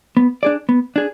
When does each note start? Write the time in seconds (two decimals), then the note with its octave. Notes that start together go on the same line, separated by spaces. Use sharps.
0.17 B3
0.43 D4 G#4 D5
0.69 B3
0.96 D4 G#4